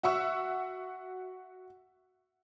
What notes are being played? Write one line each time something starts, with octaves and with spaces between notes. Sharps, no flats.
F#4 E5 F#5 C#6 E6